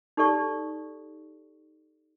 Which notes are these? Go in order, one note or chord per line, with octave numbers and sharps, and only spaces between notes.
D#4 G4 A4 D5 C#6